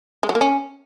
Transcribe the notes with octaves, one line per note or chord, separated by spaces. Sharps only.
G#3
F#3
A#3
C#4